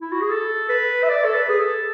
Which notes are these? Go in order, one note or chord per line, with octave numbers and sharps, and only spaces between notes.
E4
F#4
G#4
A4
B4
E5
D5
A4
B4
G#4
A4